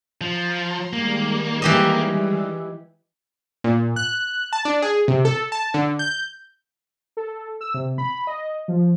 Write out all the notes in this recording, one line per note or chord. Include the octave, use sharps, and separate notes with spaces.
F3 A#5 C6
D#3 G3 G#3 A#3
E3 G4 D#5
A#2
F#6
A5
D4
G#4
C3
A4
A5
D3
G6
A4
E6
C3
B5
D#5
F3